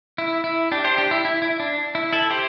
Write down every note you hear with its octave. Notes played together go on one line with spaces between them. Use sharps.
E4
E4
D4 G4
G4 C5
D4 G4
E4
E4
E4
D4
E4
E4 A4
G4 C5